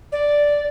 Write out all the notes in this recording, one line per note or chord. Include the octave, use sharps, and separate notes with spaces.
D5